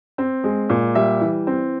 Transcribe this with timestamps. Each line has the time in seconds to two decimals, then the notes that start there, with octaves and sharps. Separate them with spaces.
0.18 C4
0.44 G#3
0.70 A#2
0.95 G3 E5
1.21 E3
1.47 C4